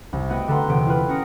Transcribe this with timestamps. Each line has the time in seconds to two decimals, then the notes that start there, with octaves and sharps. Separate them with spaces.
0.13 C2
0.29 A3 B3 F#4 D#5 G5
0.48 D3 A4 B4 A#5 C6
0.67 E1 C3 B3 G5
0.86 E4 F4 B4
1.08 C#4 F#4 A#4 D#6 A#6 C#7